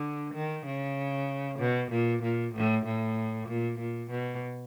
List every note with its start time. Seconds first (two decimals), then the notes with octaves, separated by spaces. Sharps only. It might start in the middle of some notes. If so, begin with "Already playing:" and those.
Already playing: D3
0.34 D#3
0.66 C#3
1.59 B2
1.91 A#2
2.23 A#2
2.54 A2
2.85 A2
3.48 A#2
3.79 A#2
4.11 B2